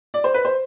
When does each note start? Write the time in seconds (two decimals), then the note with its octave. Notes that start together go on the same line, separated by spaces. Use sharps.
0.14 D5
0.24 C5
0.34 B4
0.45 C5